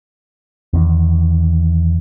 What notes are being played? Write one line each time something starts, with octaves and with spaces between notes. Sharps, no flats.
E2 D#3